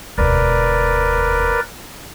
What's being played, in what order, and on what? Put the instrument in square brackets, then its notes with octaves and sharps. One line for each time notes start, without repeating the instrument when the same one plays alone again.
[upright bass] E1 D2 [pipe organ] A#4 B4 D5